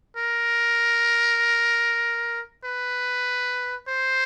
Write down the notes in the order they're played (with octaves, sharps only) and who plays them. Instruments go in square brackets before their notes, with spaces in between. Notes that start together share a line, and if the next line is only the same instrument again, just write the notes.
[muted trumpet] A#4
B4
C5